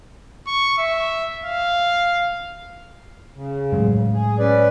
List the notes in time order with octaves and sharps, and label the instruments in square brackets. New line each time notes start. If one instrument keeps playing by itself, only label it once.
[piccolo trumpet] C#6
E5
F5
[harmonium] C#3
[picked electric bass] A2 F#3 G#3
[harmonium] G#4
C#4 B4 D5